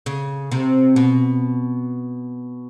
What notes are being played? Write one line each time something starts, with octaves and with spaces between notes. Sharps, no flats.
C#3
C3
B2